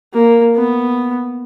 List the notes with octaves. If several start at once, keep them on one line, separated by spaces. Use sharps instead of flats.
A#3
B3